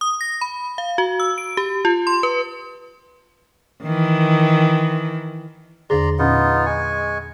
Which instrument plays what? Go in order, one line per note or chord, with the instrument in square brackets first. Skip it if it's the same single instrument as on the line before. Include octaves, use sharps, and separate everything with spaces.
[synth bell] D#6
A#6
B5
F5
F#4
E6
D7
G4
F4
C6
B4
[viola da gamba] D#3 E3
[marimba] E2 D3 G#4 [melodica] D5 A#5 C6
[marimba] A#2 C#4 [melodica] B3 D#4 F4
[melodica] G#3 G#5 C#6